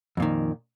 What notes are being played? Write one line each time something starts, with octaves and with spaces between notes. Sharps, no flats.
F2 A#2 D#3